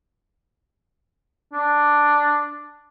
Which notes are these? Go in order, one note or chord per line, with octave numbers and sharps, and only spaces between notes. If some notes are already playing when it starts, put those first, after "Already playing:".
D4